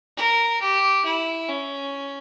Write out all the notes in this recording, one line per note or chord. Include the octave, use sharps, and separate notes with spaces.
A#4
G4
E4
C#4